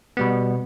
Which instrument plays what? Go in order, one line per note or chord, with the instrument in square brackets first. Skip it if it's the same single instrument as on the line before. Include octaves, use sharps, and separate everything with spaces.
[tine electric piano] B2 G3 B3